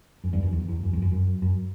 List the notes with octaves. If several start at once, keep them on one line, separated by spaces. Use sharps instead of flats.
F#2
E2 G2
F#2
E2
E2
F#2
E2
F#2
F#2
F#2